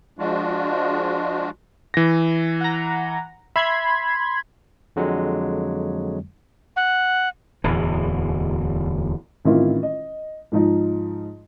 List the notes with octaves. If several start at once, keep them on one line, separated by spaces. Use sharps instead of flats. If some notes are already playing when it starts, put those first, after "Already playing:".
F3 G#3 D4 F4 F#4
E3 A#6
F#5 A#5
E5 B5 C6 G#6
F2 D3 F#3 G#3
F#5
D1 E2 E3
A1 D#3 C4 E4 F4
D#5
G#2 F3 D#4